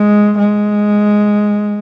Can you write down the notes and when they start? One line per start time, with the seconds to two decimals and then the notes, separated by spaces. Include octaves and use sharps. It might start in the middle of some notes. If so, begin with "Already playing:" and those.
Already playing: G#3
0.39 G#3